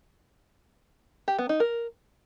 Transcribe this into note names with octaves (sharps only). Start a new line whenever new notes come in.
G4
B3
D#4
A#4